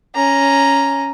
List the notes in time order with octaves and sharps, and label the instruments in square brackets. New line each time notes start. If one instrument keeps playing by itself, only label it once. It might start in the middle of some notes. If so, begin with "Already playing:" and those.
[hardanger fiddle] C#4 A#5